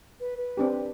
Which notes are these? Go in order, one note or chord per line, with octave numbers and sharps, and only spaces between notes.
B4
B4
C4 D4 G4